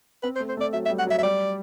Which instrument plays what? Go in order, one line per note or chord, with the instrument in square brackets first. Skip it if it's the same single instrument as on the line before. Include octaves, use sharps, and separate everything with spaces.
[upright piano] C4 [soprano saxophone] B4
[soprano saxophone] C5
[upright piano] A3
[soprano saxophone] C5
[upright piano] A3 [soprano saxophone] D5
[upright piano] F#3 [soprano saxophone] E5
[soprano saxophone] E5
[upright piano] G3
[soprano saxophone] F#5
[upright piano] F#3 [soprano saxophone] E5
[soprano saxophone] E5
[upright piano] G3 [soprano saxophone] D5